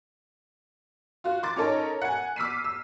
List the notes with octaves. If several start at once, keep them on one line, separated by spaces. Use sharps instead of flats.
F4 F#4
C6 D6 A6
C#4 D#4 A4 A#4 C#5
F#5 G#5
D6 E6 F6 B6 C7 D#7
E6